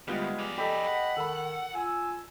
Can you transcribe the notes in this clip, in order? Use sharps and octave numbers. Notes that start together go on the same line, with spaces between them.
D2 G3 G#3 B3 F4
G#4 D5
G4 A4 D#5 B5
F#5
D#3 A4 B5 E6
F4 G#5 E6